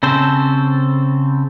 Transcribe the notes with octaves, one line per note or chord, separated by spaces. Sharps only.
C#3 C4 A4 C5